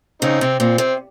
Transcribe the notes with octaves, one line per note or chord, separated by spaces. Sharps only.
C#3 C4 D#4
C3 C4
A#2 C4
C3 C4